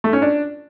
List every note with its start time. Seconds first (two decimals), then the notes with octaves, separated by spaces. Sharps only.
0.04 A3
0.13 C#4
0.22 D4